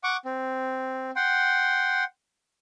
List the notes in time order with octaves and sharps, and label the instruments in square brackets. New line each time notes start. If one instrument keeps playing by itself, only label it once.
[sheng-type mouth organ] F#5 C#6 D6
C4
F#5 G5 C6